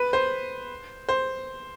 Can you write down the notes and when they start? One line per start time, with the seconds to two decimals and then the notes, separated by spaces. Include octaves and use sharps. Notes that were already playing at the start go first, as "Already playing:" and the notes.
Already playing: B4
0.13 C5
1.09 C5